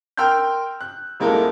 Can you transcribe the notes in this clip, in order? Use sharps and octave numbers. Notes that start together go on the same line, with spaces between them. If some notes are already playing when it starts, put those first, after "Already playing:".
A#4 G5 C6 E6 F6 G6
F#6
D#1 G#3 A#3 E4 A4 A#4